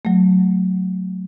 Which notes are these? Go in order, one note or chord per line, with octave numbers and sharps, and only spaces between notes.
F#3 A3